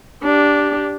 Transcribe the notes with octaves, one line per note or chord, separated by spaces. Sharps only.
D4 G4